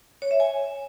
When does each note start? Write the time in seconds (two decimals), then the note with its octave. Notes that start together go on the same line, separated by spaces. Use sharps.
0.22 C#5
0.31 E5
0.40 G#5